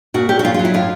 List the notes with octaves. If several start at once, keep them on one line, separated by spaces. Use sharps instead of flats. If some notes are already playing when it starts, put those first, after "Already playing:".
A#2 F#4
A#2 G4
F#4
F#3 F4
F#3 F4
E4
A2 F4